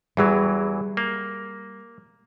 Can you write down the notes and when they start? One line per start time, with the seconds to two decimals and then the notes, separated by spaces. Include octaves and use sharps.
0.17 E2 E3 F#3 G3 G#4
0.97 A#3